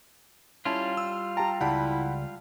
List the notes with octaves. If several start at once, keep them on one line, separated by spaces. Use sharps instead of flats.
G3 C#4 E4 F4 A5
E6
G4 G5 A5 A#5
C#2 E4 D5 F#5 G5 A5 B5